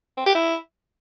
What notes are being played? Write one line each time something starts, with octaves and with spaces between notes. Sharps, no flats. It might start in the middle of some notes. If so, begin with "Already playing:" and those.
C4
G4
E4